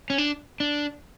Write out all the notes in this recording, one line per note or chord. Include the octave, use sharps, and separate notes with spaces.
C#4
D4
D4